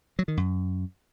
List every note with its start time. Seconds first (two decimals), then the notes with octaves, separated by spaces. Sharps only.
0.19 F#3
0.28 D#3
0.37 F#2